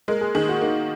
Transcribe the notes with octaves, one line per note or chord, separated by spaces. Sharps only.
G#3 A#4
G#4
D#3 G#4
F#4
A#3 D#4